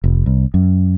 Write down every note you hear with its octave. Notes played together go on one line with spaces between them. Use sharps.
F1
C2
F#2